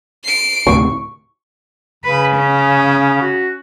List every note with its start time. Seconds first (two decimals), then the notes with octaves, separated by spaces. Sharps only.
0.24 C7 D7
0.67 D2 A2 C3 C#6
2.04 C#3 B4
2.36 C#4
3.21 F#4